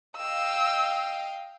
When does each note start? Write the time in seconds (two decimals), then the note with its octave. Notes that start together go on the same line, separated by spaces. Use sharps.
0.17 D#5 F5 G5 E6